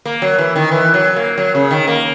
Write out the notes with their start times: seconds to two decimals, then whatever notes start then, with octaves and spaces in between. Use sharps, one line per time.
0.05 A#3
0.22 F#3
0.39 E3
0.56 D#3
0.71 E3
0.94 F#3
1.16 A#3
1.38 F#3
1.55 C#3
1.71 D#3
1.88 A#3